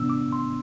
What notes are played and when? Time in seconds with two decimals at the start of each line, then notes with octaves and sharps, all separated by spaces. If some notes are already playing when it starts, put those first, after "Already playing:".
Already playing: C3 E3 B3 D4 E6
0.10 D6
0.32 C6